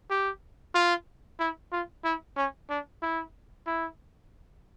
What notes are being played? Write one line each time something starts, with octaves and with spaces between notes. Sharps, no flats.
G4
F4
E4
F4
E4
C#4
D4
E4
E4